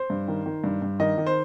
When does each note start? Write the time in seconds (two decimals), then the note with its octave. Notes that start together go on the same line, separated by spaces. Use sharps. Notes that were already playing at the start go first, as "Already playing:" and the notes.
Already playing: C5
0.10 G2
0.28 D#3
0.46 D#3
0.64 G2
0.82 G2
1.00 D#3 D#5
1.18 D#3
1.27 C5